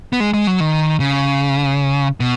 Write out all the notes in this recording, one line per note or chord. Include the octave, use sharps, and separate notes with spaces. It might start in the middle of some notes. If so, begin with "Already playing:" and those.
B3
G#3
G#3
F#3
D#3
C#3
B2